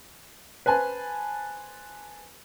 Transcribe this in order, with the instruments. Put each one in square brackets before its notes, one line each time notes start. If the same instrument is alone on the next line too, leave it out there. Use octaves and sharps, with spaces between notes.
[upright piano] B4 C5 G#5 A5